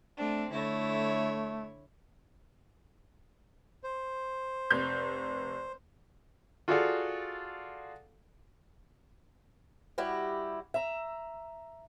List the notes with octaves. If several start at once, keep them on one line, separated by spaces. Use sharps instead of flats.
A3 C4 D4
D3 A3 E4 C#5
C5
F1 G6
F4 F#4 G#4 A4 D5 F5
G3 E4 F#4 G4
E5 A#5